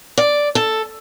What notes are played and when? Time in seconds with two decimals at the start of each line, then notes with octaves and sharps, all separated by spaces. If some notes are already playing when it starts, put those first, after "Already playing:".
0.18 D5
0.55 A4